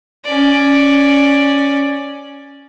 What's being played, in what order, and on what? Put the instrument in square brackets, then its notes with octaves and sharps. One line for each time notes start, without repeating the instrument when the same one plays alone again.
[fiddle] C#4 D5